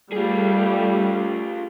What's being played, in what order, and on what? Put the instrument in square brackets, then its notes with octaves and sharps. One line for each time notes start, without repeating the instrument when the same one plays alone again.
[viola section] G3 A3 [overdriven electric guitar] F4 G#4